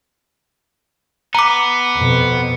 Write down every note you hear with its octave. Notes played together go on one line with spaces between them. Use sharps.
B3 A#5 D6
F2 B2